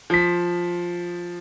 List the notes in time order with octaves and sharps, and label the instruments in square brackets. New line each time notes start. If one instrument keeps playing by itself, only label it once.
[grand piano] F3 B6